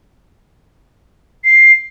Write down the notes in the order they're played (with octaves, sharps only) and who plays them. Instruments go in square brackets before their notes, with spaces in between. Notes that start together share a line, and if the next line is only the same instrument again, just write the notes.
[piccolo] C7